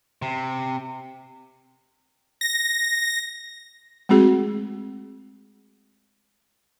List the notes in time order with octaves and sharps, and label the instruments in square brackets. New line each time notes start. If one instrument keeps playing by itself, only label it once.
[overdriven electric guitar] C3
[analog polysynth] A#6
[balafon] G#3 A3 C4 F#4 G#4